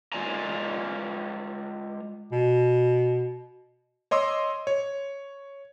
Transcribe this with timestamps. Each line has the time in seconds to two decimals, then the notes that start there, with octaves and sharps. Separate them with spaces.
0.13 G#3 F4 D5 G#5 A#5
2.32 B2
4.11 C#5 D#5 C6 D6 E6
4.67 C#5